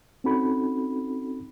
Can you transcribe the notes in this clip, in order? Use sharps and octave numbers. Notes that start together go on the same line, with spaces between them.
C4 C#4 D#4 F#4 A4 B5